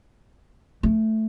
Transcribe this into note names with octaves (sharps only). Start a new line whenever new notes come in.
A3